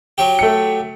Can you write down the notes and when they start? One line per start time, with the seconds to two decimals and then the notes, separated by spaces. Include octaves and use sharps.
0.18 F#3 G4
0.39 A3 C#7